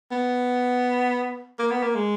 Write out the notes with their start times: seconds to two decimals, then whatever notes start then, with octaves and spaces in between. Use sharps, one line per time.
0.11 B3
1.59 A#3
1.71 B3
1.83 A#3
1.95 G#3